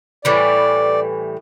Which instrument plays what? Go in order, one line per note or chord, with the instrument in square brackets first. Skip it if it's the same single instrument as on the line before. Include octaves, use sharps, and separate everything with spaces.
[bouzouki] A2 E3 G3 [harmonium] D5